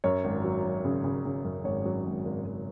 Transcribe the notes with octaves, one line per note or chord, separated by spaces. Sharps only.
F#2 C#5
G#1
F#3
F#3
C#3
C#3
C#3
F#2
G#1 C#5
F#3
G#1
G#1
G#1